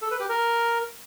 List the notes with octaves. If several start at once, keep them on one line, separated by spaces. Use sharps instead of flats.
A4
B4
G4
A#4